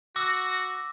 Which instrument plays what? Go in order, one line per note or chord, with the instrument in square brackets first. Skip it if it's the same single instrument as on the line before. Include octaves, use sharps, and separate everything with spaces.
[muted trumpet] F#4 [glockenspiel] D6 E6 A#6